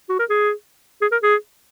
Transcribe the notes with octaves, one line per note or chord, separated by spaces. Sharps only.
F#4
A#4
G#4
G#4
A#4
G#4